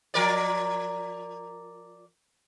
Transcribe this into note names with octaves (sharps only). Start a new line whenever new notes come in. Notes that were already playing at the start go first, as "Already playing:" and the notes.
F3 A#4 D5